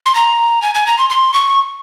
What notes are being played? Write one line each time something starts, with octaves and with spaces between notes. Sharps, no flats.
C6
A#5
G#5
G#5
A#5
C6
C6
C#6